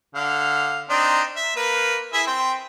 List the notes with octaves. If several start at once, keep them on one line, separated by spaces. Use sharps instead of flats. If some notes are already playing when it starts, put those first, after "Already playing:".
D3 F5
C4 D4 D#4
E5
A#3 B4
E4 G#4 E5
C4 G5